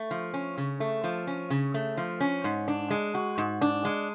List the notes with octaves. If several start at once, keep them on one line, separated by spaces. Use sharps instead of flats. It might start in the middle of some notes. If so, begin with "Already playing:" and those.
Already playing: A3
F3
C#4
C#3
A3
F3
C#4
C#3
A3
F3
C#4
G#2
D4
G#3
F#4
G#2
D4
G#3